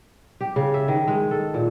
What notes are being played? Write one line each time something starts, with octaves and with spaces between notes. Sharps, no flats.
G4
C#3
E5
D#3
G#3
A4
A#2